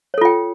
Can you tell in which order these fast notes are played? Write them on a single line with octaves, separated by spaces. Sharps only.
C#5 A4 F4 G5